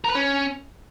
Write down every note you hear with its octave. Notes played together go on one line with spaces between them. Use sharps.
A#4
B4
C#4